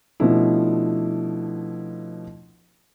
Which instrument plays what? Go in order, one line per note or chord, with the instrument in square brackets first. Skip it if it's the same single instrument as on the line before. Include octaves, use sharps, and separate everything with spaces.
[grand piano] B2 F3 A3 C#4 D4 E4